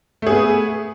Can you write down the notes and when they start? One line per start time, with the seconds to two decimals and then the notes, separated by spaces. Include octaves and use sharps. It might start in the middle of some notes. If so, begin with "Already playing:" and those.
0.22 A3
0.27 G#4
0.31 B3